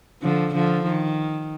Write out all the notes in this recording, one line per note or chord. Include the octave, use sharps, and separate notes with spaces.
D3 F3
D3 F3
D#3